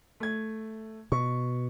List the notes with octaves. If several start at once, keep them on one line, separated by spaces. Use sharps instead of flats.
A3 G#6
B2 C#6